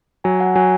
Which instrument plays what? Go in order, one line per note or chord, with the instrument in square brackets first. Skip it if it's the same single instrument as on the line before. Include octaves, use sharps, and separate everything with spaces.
[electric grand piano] F#3 [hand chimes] G#5
[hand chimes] F#5
[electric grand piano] F#3 [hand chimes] G#5